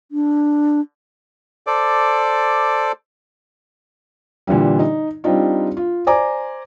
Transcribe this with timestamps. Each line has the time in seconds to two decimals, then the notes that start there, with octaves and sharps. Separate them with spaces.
0.12 D4
1.67 A4 C5 D5 D6
4.47 A#2 D3 E3 G3
4.79 D#4
5.24 G3 C4 D4 D#4 F4
5.77 F4
6.07 C5 D5 G#5 A#5 D6